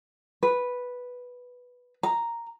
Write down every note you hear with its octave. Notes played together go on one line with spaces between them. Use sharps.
B4
A#5